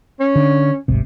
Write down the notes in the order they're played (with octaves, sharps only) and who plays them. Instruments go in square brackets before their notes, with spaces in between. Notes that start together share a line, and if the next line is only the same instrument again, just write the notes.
[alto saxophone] C#4
[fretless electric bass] D3
D1 G#1 C3